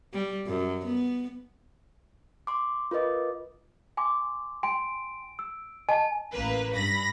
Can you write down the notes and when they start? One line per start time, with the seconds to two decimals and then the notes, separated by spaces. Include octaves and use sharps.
0.13 G3
0.47 F#2
0.85 B3
2.47 C6 D6
2.91 F4 A#4 B4 D#5 D6
3.97 G#5 C6 D6
4.63 G5 G#5 C6 D7
5.39 E6
5.89 D#5 G#5 A5
6.32 A1 A#3 B4
6.73 G2 B5 A#6